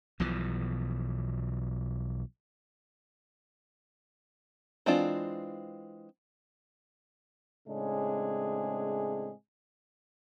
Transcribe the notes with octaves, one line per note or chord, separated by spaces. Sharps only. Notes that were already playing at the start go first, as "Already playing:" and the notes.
B1 B2 E3 F3
E3 G#3 C4 D4 F4
A2 C#3 G#3 C4 D4 G#4